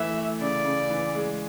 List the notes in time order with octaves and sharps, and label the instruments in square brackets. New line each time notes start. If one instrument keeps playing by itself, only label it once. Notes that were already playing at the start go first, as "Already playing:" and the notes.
Already playing: [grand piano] E3 A3 [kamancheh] E5
[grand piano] A3
[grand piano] C#3 [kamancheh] D5
[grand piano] C#3
E3
G#3